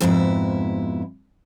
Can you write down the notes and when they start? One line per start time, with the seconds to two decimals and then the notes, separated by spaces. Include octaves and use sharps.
0.01 F2 G#2 B2 E4